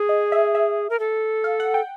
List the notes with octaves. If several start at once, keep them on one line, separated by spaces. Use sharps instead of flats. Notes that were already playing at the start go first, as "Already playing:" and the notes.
Already playing: G#4
D#5
E5
E5
A#4
A4
F5
F#5
G5